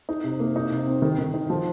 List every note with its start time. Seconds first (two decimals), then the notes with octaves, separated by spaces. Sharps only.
0.09 D#4
0.24 C3
0.40 A#3
0.56 D#4
0.71 C3
0.87 C4
1.02 D#3
1.19 D#3
1.34 D#4
1.50 F3